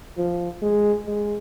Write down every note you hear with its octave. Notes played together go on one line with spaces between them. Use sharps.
F3
G#3
G#3